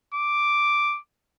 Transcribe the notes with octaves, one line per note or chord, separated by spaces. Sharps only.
D6